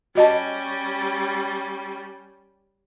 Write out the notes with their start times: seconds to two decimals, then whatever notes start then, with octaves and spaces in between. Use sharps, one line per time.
0.15 G3 C#4 F#4 D#5 A5